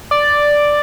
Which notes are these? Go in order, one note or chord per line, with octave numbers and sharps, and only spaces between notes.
D5